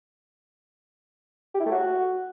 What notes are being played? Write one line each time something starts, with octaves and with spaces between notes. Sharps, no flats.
G4
E4
A3
F#4